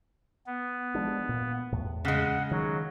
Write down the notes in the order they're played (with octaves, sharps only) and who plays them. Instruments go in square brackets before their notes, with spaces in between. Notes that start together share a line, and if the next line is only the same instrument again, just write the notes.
[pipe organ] B3
[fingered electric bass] F3 G#3 D4
A#2
E2 A2
[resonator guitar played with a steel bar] C#3 G#3 [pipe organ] F#5
[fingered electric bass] D#3 [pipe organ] F#3